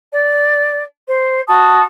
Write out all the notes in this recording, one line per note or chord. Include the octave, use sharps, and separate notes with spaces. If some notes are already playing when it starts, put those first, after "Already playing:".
D5
C5
F#4 A5 D#6